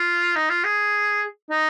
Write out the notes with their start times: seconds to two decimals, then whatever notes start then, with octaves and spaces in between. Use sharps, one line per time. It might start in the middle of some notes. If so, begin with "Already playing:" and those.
Already playing: F4
0.36 D#4
0.50 F4
0.64 G#4
1.50 D#4